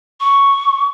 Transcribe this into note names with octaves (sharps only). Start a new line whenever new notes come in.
C#6